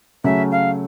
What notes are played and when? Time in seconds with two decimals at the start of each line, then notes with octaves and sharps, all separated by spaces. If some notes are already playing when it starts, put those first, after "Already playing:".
0.24 C#3 F#3 A3 C#4 E5
0.51 F5